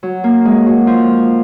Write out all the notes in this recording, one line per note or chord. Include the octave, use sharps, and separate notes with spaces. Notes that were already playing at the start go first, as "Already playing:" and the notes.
F#3
A#3
G#3
F#3
F3